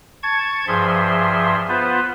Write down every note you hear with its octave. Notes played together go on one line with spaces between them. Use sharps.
A5 C#6 G#6
G2 F3 G#4 E5 C6
B3 F4 B4 C5